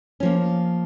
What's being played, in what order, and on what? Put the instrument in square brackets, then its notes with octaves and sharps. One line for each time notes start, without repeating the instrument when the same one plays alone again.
[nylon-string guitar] F3 A#3 C#4